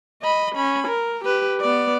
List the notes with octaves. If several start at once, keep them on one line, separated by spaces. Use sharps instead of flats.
D#5 B5
C#4 B5
A#4
G4 B4
B3 D5